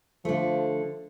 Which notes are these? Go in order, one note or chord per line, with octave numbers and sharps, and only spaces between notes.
D3 F3 A3